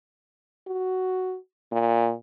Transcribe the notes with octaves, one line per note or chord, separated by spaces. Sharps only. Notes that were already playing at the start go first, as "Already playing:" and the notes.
F#4
A#2